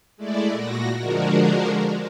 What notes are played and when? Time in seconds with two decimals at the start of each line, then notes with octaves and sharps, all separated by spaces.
0.17 G#3 A3 E4 D5
0.50 A#2 F#4 A#6
0.97 D3 F3 G#3 D4 F#4 A#4